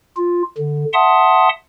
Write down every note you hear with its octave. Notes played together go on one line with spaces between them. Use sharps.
F4
D3
E5 F#5 A5 C6 D#6